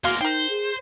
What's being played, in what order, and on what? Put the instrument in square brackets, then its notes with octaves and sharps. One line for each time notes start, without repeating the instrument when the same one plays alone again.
[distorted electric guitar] E2 A#3 [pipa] G#3 F5 C6 [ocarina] F#4
[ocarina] D#4 [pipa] A#4 G5 [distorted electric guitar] C5
[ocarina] G#4